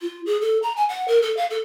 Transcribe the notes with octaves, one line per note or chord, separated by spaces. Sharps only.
F4
G#4
A4
A#5
G#5
F#5
A#4
A4
F5
A4